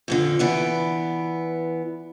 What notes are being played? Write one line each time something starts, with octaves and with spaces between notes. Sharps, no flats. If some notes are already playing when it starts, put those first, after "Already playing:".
F2 A#2 D3
E3 B3 D5